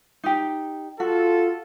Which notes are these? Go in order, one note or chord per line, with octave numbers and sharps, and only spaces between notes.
D#4 G4
F4 F#4 A4